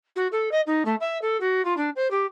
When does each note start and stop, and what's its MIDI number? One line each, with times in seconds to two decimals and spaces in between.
0.16 0.28 66
0.32 0.49 69
0.51 0.61 75
0.66 0.83 63
0.85 0.95 57
1.00 1.18 76
1.22 1.37 69
1.40 1.64 66
1.65 1.74 65
1.77 1.90 62
1.96 2.10 72
2.11 2.26 67